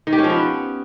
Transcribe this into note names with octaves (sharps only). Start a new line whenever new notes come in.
D#3
G4
C#4
F3
B3